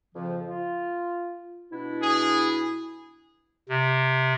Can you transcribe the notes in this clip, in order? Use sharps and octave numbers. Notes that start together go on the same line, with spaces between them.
F2 C#3 F3
F4
B2 D4 E4
G#4
C3